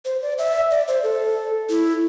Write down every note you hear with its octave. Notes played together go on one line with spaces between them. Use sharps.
C5
D5
E5
D5
C5
A4
E4